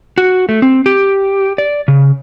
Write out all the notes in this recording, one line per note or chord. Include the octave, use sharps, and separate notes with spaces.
F#4
A3
C4
G4
D5
C#3